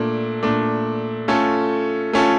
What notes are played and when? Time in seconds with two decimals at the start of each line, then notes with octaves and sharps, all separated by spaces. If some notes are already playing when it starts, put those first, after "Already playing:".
Already playing: A#2 A3 D4
0.43 A#2 A3 D4
1.28 A3 C#4 F4 A4
2.13 A3 C#4 F4 A4